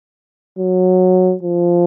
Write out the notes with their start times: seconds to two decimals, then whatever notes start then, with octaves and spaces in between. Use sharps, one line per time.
0.58 F#3
1.43 F3